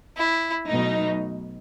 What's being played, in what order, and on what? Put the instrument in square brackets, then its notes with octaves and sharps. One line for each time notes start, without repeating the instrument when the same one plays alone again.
[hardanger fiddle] E4
[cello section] B2 F#3 A3 D#4